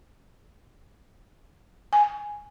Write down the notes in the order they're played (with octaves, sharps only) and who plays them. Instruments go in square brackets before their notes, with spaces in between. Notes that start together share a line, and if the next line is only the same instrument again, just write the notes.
[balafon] G#5